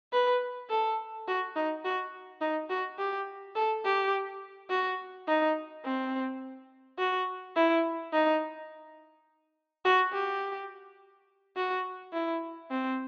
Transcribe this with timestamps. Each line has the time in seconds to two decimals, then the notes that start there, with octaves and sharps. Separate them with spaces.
0.13 B4
0.70 A4
1.28 F#4
1.56 D#4
1.85 F#4
2.41 D#4
2.69 F#4
2.98 G4
3.55 A4
3.85 G4
4.70 F#4
5.28 D#4
5.85 C4
6.99 F#4
7.56 E4
8.12 D#4
9.85 F#4
10.13 G4
11.56 F#4
12.13 E4
12.71 C4